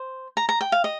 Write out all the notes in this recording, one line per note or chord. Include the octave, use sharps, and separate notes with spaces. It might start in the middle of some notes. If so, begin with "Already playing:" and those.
Already playing: C5
A#5
A#5
G5
F5
D#5